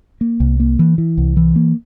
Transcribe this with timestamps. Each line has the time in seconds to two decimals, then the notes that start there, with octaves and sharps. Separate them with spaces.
0.21 A#3
0.40 C2
0.60 A#3
0.79 E3
0.98 E3
1.17 C2
1.37 E3
1.56 A#3